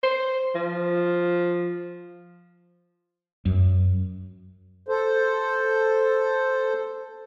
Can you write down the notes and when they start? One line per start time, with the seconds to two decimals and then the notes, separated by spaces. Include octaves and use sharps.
0.03 C5
0.55 F3
3.46 F#2
4.88 A4 C5